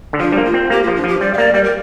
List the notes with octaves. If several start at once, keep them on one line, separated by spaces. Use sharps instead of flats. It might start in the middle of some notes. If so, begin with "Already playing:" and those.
D3
F3 D4
G3
A#3
F4
C4
A#3 G4
F3 F4
D4
F3 G4
G3 D5
F5
A#3 D5
G3 D5
A#4